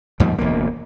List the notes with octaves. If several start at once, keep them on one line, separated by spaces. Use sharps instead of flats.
D#2 G#2 F3 G3
E1 D2 A#3